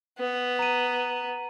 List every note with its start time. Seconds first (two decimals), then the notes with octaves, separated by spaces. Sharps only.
0.19 B3
0.59 A#5 D#7